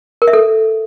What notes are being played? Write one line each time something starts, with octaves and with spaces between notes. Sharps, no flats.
A#4
E5
A4